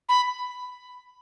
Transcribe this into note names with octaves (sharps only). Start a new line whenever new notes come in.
B5